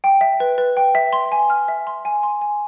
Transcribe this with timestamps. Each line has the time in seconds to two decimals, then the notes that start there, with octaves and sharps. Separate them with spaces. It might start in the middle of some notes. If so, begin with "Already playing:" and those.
0.04 G5
0.21 E5
0.40 B4
0.58 B4
0.77 G5
0.95 E5
1.13 C6
1.32 G#5
1.50 F6
1.68 E5
1.87 C6
2.05 G#5
2.23 C6
2.41 G#5